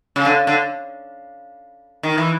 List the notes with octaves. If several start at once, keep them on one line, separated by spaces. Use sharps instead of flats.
C#3
D3
D3
D#3
E3